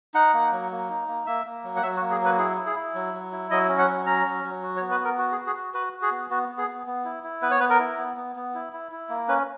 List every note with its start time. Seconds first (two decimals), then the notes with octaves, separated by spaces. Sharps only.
0.14 D#4 F#5
0.33 A#3
0.52 F#3
0.71 A#3
0.89 D#4
1.08 A#3
1.26 A#3 E5
1.45 A#3
1.64 F#3
1.76 F#5
1.82 F#3 E5
1.96 F#4
2.01 A#3
2.11 G#4
2.21 F#3 B4
2.38 E4 G#4
2.57 E4
2.66 G#4
2.76 E4
2.94 F#3
3.14 F#3
3.32 E4
3.51 F#3 D#5
3.69 C#4
3.79 F#5
3.87 F#3
4.06 C#4 A#5
4.25 F#3
4.44 F#3
4.63 F#4
4.77 C#5
4.81 B3
4.91 B4
5.00 B3 A#4
5.18 F#4
5.32 G#4
5.37 F#4
5.47 G#4
5.56 F#4
5.74 F#4 B4
5.93 F#4
6.02 G#4
6.11 B3
6.30 B3 F#4
6.49 B3
6.58 G#4
6.68 B3
6.87 B3
7.05 E4
7.23 E4
7.42 B3 B4
7.51 C#5
7.60 B3 B4
7.70 A#4
7.79 E4
7.98 B3
8.17 B3
8.36 B3
8.54 E4
8.73 E4
8.92 E4
9.09 A#3
9.28 C#4 B4